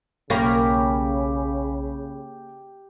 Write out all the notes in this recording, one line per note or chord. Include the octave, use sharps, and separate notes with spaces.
B1 C#3 A#3 G4 C#5 B5